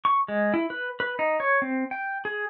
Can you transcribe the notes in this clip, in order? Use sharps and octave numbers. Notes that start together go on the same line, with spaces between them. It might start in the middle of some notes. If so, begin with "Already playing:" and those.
C#6
G#3
E4
B4
B4
D#4
C#5
C4
G5
G#4